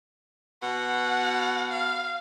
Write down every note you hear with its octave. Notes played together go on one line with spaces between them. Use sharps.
B2 F#5
F5